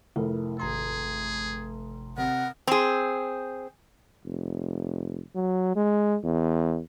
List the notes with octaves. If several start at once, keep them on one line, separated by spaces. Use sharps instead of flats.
F1 E4 A#4
G#1 G#4 A#5 C6
C3 A#4 F#5
C4 G#4
F1
F#3
G#3
E2